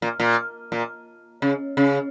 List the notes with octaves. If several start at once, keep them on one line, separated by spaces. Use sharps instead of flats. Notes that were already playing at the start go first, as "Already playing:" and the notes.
A#2
A#2
A#2
C#3
C#3